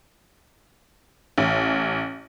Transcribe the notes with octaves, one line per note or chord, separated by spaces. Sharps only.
A1